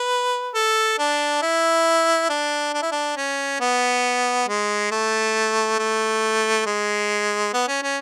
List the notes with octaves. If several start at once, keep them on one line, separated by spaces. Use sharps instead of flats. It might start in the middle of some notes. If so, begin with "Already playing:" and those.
Already playing: B4
A4
D4
E4
D4
D4
E4
D4
C#4
B3
G#3
A3
A3
G#3
B3
C#4
C#4